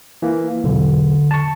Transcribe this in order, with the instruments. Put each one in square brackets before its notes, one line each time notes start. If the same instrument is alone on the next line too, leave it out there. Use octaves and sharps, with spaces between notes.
[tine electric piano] E3 A#3
[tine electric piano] B1 E2 [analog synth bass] D3
[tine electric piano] A5 C#6